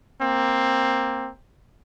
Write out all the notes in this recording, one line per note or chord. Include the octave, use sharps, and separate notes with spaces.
A#3 C4